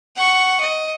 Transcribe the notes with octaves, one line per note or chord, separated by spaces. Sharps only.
F#5 C#6
D#5